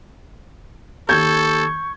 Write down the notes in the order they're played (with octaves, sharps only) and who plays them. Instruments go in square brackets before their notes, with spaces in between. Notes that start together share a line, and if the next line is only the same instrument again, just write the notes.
[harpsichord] D#2 [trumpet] A4 [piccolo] C#6 [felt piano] G6 G#6